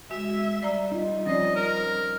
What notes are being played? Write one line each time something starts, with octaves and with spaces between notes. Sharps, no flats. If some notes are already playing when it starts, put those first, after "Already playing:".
G#3 F#4 E5
G3 D5 E5 A#5
D#4 F4
F3 C4 C#4 D#4 D5 D#5
A#4